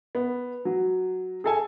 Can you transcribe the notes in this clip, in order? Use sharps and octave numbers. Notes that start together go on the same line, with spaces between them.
B3
F#3
G#4 A4 G#5